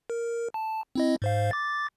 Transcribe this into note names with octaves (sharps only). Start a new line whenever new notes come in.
A#4
A5
C4 E4 D#5
G#2 C5 F5
D6 A6